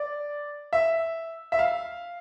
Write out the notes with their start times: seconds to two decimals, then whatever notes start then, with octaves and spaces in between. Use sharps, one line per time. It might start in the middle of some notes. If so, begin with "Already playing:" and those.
Already playing: D5
0.73 E5
1.52 E5
1.59 F5